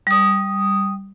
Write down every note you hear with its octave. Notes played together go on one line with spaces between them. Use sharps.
G3 D#6